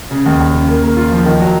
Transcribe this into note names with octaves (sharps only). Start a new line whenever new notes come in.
C#3
D#2
D#2
C#3
A#3
A#3
F4
F3
D#3
F#3